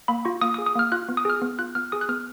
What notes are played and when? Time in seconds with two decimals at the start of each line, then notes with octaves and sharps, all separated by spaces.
0.08 A#3 B5
0.25 F4 C#6
0.41 A#3 D#6
0.54 D#6
0.58 G#4
0.66 D#6
0.75 A#3 F6
0.92 F4 F#6
1.09 B3
1.17 D#6
1.25 G#4 F6
1.42 B3
1.59 F4 F#6
1.75 B3 F6
1.92 G#4 D#6
2.01 F#6
2.09 B3 F6